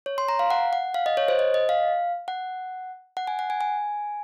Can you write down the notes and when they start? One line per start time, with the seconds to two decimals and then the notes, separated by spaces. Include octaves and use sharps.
0.06 C#5
0.18 C6
0.29 A#5
0.39 F5
0.50 F#5
0.73 F#5
0.94 F5
1.06 D#5
1.17 C#5
1.28 C5
1.39 D#5
1.54 D#5
1.69 F5
2.28 F#5
3.17 F#5
3.27 G#5
3.39 F#5
3.50 G#5
3.61 G#5